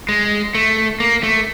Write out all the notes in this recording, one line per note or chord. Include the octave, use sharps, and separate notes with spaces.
G#3
A3
A#3
A3